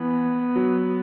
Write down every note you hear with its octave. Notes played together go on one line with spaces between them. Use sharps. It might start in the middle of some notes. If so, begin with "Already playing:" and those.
Already playing: E3 B3
F#3